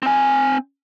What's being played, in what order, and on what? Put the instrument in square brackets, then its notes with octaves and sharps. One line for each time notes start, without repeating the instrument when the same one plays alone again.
[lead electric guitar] C4 G#5